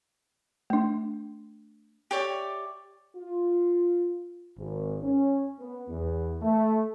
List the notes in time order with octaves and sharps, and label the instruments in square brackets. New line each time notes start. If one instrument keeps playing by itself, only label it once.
[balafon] A3 D4
[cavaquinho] G4 C#5 D5 E5
[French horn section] F4
[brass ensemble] G#1
C#4
B3
E2
A3